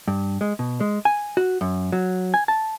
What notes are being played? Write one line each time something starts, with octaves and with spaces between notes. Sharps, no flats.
G2
G#3
B2
G#3
G#5
F#4
F#2
F#3
G#5
A5